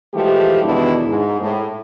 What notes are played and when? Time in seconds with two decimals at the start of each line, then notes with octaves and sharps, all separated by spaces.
0.14 E3 F3 G#3 A3 G4
0.63 E2 B2 D#3 E3 D4 E4
1.07 G#2
1.39 A2